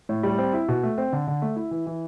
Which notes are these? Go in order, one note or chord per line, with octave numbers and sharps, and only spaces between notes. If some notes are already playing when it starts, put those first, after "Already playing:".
A2
G3
C4
E4
B2
A3
C4
D3
D3
A3
E4
E3
E3